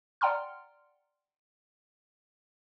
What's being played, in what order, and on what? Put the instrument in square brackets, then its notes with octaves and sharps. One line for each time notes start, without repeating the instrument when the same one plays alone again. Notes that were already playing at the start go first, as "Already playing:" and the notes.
[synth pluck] D5 F#5 G5 A#5 C6 F6